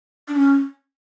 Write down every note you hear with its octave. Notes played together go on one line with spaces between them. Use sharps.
D4
C#4